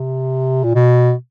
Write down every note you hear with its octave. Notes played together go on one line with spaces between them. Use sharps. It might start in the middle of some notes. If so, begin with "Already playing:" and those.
Already playing: C3
A#2
B2